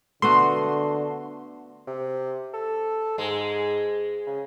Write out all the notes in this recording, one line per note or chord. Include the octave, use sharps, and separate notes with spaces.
D3 A3 B3 F#4 C6
C3
A4
G#2 G#3
C#3